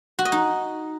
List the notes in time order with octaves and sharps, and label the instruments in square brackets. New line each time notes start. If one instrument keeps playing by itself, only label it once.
[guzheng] F#4
D#5
D#4